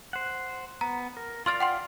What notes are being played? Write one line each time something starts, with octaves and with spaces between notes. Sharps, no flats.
C5 F#5
B3 A#5
A#4
F4 D5 F5 C6 F6 A6
F#5 G5 C6